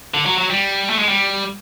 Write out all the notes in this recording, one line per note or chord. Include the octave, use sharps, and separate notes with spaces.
D3
F#3
F#3
G3
A3
G#3
G3